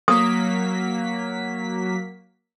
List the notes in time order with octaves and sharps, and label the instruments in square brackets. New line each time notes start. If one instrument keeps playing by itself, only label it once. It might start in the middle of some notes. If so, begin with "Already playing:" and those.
[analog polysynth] F#3 A#3 B6 [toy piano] D#6